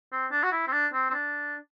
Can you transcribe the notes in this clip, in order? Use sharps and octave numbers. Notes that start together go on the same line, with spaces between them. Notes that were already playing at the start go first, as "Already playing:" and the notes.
C4
D4
F#4
E4
C4
D4
C4
C4
D4